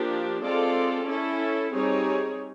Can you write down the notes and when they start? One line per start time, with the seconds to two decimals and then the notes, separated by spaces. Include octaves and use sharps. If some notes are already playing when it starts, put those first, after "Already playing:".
Already playing: F3 A#3 D4 G4
0.42 G#3 C4 F4 A4 D5
1.06 C#4 E4 A4
1.71 G3 C4 D#4 G#4 C#5